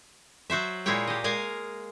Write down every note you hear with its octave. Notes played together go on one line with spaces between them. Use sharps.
F#3 F#4 C5 E5
A#2 G#3 A#3 E4 C#5 G5
G4 D#5
G#3 A#4 F5 G#5